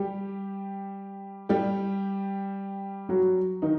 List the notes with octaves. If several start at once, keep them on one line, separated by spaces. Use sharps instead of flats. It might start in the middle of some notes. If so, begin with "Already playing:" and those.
Already playing: G3 G4
G3 G4
F#3 F#4
D#3 D#4